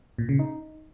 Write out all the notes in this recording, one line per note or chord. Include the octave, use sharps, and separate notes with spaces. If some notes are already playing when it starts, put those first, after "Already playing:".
A#2
C#3
D#4